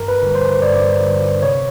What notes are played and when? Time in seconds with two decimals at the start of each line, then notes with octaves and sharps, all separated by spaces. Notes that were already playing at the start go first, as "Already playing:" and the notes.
Already playing: G2 A#4
0.08 B4
0.22 D3 G3
0.35 C5
0.62 G2 D5
1.03 D3 G3
1.43 C3 C#5